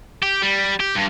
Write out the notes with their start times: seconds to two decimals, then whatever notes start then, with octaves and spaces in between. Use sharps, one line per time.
0.23 G4
0.42 G3
0.80 G4
0.95 G2